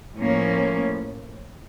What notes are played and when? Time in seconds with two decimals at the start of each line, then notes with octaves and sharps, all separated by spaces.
0.18 A2 F3 A#3 C#4